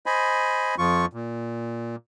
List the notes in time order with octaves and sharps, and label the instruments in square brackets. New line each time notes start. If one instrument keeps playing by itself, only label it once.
[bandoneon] C5 D#5 G#5 B5
F2 F3 F4 C#6
A#2